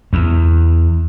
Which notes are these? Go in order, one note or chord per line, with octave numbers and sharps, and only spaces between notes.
E2